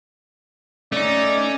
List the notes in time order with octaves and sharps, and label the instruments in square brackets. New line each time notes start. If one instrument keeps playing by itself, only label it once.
[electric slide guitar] A3 D#4 [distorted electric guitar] C#4 [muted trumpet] D5